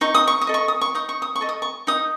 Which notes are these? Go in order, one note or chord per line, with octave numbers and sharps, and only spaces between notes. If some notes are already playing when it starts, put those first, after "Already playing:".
D#4 C#6
D#6
C#6
D#6
A4 D#5
C#6
D#6
C#6
D#4 D#6
C#6
D#6
C#6
A4 D#5
D#6
C#6
D#4 D#6